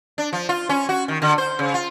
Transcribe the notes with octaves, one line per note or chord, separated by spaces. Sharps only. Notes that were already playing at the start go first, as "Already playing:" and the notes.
D4
F3
F4
C#4
F#4
D#3
D3
C5
C#3
F4